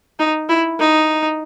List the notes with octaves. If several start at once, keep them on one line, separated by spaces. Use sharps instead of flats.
D#4
E4
D#4